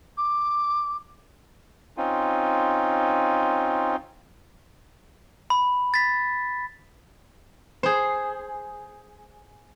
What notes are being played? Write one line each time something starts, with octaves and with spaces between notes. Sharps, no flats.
D6
C4 C#4 D#4 F4
B5
A6 B6
G#4 C5